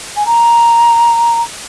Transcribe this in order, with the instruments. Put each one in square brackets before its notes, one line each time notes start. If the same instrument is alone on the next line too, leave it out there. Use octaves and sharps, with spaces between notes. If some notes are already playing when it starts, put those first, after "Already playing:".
[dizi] G#5
A#5